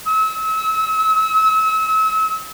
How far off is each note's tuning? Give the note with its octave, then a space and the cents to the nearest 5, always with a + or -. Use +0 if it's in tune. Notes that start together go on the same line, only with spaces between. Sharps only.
E6 -35